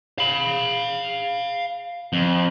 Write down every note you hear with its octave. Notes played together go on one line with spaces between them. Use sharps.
F5 B5
F2